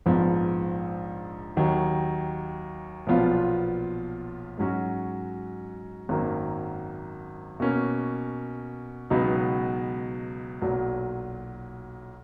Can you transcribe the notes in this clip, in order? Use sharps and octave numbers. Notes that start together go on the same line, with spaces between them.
A#1 G#2 F3 B3
D#2 D#3 F#3
B1 A#2 F3 B3 F4
G#2 F#3 C#4 F#4
G#1 F#2 D#3 F#3 A#3
B2 A#3 C#4
C#2 B2 F#3 B3 D#4
B1 A#2 F#3